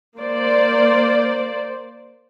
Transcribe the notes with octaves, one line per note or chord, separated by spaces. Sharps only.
A#3 C5 D5